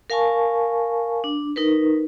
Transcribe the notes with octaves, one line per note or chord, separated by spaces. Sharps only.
A#4 F5 G#5 A5 C#6
D4
D#4 A#4 B4